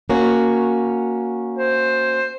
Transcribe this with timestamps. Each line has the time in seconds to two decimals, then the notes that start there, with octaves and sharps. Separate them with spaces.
0.10 A#3 C#4 F#4
1.58 C5